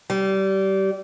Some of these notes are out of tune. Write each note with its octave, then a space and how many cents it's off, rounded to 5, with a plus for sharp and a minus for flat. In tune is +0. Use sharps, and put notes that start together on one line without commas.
G3 -25